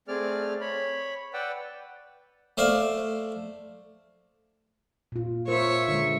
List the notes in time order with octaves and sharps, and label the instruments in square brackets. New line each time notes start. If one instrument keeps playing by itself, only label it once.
[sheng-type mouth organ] A3 C4 G#4 D5 F6
C#5 B5
B4 D5 F#5 G5 E6
[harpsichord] A3 C5 D5 F5
[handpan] A#2 F4
[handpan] F4 A#4 C5 [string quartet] C#5 E5 C#6
[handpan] D3 G#3